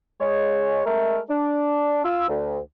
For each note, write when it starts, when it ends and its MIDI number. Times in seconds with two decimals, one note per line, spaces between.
0.21 0.85 56
0.21 0.85 73
0.86 1.19 56
0.86 1.19 57
0.86 1.19 70
1.29 2.02 62
2.05 2.28 65
2.05 2.28 88
2.28 2.58 38